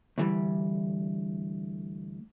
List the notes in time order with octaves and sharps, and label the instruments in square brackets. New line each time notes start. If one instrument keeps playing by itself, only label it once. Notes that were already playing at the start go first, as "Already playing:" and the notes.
[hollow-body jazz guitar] D2 E3 G3